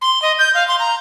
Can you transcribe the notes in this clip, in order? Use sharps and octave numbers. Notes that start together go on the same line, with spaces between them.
C6
D#5
G6
F5
C6
A#5